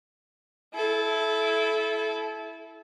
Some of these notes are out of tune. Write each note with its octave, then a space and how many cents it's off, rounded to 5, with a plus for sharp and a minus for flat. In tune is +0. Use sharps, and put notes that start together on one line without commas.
E4 +0 A4 -25